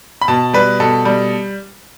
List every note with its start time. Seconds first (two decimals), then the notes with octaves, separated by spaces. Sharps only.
0.21 B5
0.28 B2 A5
0.54 G3 B4
0.80 B2 A4
1.05 G3